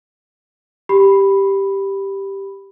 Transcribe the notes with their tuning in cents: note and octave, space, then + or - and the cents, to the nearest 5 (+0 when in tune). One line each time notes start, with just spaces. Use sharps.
G4 +0 B5 +0